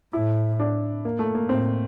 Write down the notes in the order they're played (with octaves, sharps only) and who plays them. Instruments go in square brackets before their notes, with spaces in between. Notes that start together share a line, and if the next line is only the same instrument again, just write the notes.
[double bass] A2 [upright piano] E4
[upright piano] D4
A#3
A3
A#3
[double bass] A2 [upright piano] C4